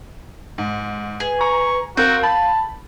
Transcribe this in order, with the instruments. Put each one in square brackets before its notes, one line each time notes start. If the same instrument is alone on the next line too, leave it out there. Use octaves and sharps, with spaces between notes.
[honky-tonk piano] G#2
[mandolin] G#4 [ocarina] B4
[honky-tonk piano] A#5 [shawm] C#6
[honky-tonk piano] C4 A#4 [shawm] F#4 [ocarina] F5 [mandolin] G6
[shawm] A5 [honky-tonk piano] B5